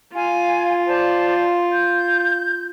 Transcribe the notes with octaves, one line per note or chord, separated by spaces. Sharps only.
F4 F5 G#5
C5 D5 A5
G6